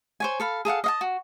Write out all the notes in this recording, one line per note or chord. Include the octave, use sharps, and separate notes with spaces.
C5 C#5 G#5
A4 F5 B5
G#4 A4 F5 F#5
D#5 F5 A5
F#4